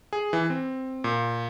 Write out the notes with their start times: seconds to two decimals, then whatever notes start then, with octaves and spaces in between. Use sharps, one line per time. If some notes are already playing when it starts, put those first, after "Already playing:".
0.13 G#4
0.33 E3
0.50 C4
1.04 A#2